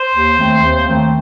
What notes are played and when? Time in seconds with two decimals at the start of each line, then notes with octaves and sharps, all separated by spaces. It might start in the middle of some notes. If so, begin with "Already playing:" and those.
Already playing: C5
0.12 D#2
0.37 D#3 A3 C4
0.62 D#2
0.87 D#3 A3 C4